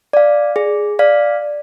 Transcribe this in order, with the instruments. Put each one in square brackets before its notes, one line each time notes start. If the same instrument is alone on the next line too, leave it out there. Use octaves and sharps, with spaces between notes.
[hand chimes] D5 F5
G#4
D5 F5